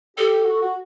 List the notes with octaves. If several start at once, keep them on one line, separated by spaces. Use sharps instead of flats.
G4 A4
F#4
F#4